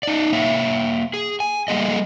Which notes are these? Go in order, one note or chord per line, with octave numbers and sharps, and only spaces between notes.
D#4 D5
A#3 C#5 E5
G#4
G#5
G3 A3 A#3 G#4 D#5